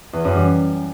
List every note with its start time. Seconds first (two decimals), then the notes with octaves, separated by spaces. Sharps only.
0.13 E2
0.25 F#2
0.36 G3